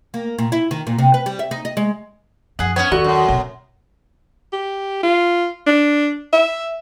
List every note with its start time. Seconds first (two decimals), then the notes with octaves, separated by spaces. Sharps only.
0.14 A#3
0.38 A#2
0.52 E4
0.71 D#3
0.87 A#2
0.98 C3
1.14 B4
1.26 G3
1.39 E5
1.51 D#4
1.65 D#5
1.77 G#3
2.59 F#2 F3 G#4 F#5
2.76 B3 C#4 C#5
2.92 D#2 D#3 F#4 A4 D5 C#6
3.04 F#2
3.28 B1 C3
4.53 G4
5.03 F4
5.67 D4
6.33 E5